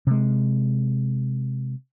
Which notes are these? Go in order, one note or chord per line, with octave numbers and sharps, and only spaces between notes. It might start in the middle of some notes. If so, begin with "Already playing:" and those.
C3 G#3